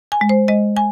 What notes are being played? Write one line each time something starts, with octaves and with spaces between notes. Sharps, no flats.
G#5
G#3
C5
G#3 D#5
G#5